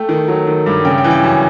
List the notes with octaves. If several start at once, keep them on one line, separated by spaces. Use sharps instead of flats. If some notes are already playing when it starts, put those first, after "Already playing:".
Already playing: A3 G5
D#3
F#3
D#3
G2
C#3 G5
G5
E3
G5
F#2